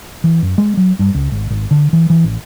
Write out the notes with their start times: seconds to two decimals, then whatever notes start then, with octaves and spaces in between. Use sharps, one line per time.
0.24 E3
0.42 F#2
0.58 G#3
0.77 F#3
0.99 G2
1.15 C#2
1.32 G#1
1.50 G#1
1.71 D3
1.93 E3
2.10 E3
2.24 A1